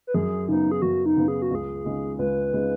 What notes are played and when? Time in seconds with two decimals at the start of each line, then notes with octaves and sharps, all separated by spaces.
0.07 B4
0.14 F#2 G#4
0.48 C#3 B3 D#4
0.72 G#4
0.82 F#2 F#4
1.06 D#4
1.17 C#3 B3
1.28 G#4
1.42 F#4
1.51 C#2 G#4
1.85 C#3 G#3 D#4
2.19 C#2 B4
2.53 C#3 G#3 D#4